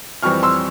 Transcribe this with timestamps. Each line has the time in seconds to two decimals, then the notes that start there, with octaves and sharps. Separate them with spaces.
0.23 F2 E3 G3 C4 C#6 F6
0.43 C6 E6